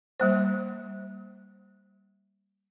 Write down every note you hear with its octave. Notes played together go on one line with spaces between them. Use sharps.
G3 A#3 C5